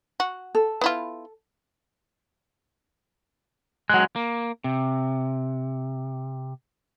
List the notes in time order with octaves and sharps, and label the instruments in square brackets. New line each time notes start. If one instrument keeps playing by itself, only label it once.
[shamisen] F#4
[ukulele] A4
[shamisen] B3 E4 F4
[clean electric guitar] F#3 G#3 [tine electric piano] F#6
[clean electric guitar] A#3
C3